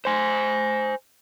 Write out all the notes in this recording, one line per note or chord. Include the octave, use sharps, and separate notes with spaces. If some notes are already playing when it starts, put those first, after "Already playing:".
C5 G#5